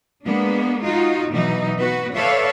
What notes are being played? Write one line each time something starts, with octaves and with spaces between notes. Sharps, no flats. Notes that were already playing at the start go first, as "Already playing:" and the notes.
G#3 A#3 B3 D4
D#4 F4 F#4
B2 E3 F#3 D#4
B3 F#4 B4
A4 B4 C#5 D5 E5 F5